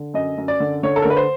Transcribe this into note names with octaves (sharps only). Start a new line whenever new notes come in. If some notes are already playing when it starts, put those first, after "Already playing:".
Already playing: D3
F#2 D#5
F#2
D5
D3
D3 C#5
A4
A#4
D3
B4
C5